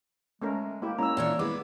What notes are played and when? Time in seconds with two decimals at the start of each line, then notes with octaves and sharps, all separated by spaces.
0.42 G#3 A3 C#4 A#4
0.82 A#3 E4 G4
0.99 G#3 A#3 C#4 E4 A#5 E6
1.17 A#2 E3 D4 C#5
1.39 G#3 B3 E4 B4 D6